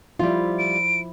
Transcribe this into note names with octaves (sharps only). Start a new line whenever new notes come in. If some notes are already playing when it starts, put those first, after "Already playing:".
F3 G3 E4 F4
D7